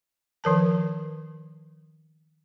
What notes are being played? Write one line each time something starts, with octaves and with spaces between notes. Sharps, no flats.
D#3 F3 A#4 A5